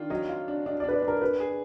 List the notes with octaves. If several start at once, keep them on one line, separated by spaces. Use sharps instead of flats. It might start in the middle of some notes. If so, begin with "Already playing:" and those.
Already playing: D#3 D4 F4
F#3 D#5
F4
D4
D4 D#5
D5
D4 B4
D5
D4
A#4
D4 B4
G#4